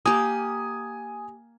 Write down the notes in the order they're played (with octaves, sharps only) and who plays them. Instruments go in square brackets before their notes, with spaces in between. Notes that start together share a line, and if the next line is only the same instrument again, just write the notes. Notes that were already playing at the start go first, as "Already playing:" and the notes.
[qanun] A#3 G4 [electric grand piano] G#5 D#6